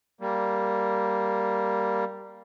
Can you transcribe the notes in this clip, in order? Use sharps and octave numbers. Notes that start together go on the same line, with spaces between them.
G3 A#3